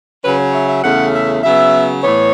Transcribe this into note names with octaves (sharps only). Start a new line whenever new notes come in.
C#3 F#3 C#4 B4
C#5
E5
E5
E2 C#3 A3 C#4 F#5
E5
C#3 F#3 B3 E5
A2 E3 B3 C#5